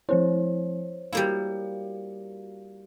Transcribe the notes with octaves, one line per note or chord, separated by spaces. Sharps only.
F3 C4 E4 C5 C#5
G3 A#3 E4 F#4 F5